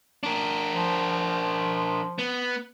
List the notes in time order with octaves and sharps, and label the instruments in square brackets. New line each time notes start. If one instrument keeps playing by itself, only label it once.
[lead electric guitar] D4 A#4
[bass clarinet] F3
[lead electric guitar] B3